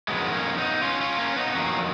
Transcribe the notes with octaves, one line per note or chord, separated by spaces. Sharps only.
F2 D#3 F#3 G#3 B3
A#3 C#4
B3 D#4
C#4 F4
C#4 F4
A#3 C#4
B3 D#4
F2 D#3 F#3 A#3 C#4